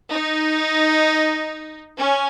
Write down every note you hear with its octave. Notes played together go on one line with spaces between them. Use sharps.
D#4
C#4